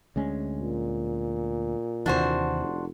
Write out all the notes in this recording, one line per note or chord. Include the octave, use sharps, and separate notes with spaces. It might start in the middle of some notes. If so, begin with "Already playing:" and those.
D2 G#3 C#4
A#2
D#2 C3 E3 D4 F#4 C5
F1